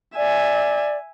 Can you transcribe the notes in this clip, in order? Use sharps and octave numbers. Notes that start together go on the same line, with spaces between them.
D5 E5 G#5